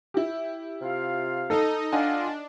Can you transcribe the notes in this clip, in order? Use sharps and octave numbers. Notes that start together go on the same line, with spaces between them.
E4 G4
C3 F4 F5
D#4 A4 D#5
D4 F4 D#5 F#5 G#5